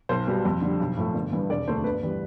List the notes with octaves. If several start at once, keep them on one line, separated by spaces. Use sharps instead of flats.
B1 C5
B2 G3
F2
D3 G3
B1
A2 F3 A3
G1
G2 E3
E1 D5
D2 D3 A3 C5
G1 B4
E3 G3